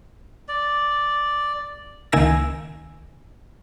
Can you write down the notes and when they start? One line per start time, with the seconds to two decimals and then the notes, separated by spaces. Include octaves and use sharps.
0.48 D5
2.12 C#2 D#3 A#3 G#5 E6 A#6